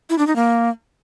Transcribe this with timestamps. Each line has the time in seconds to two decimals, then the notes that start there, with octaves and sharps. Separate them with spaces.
0.10 E4
0.18 D4
0.27 D#4
0.36 A#3